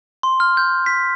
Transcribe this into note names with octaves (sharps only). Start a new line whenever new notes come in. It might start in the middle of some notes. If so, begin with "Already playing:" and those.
C6
F6
G6
B6